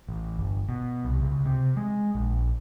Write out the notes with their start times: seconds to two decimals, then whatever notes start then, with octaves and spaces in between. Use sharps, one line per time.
0.09 A1
0.39 G1
0.69 B2
1.05 C2
1.22 C#2
1.46 C3
1.77 G#3
2.15 A#1